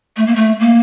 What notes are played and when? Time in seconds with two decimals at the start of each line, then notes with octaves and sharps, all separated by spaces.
0.17 A3
0.27 A#3
0.36 A3
0.60 A#3